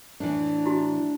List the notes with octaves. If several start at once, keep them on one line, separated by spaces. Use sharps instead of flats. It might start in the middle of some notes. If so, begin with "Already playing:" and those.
A2 E3 D4
E4 F#4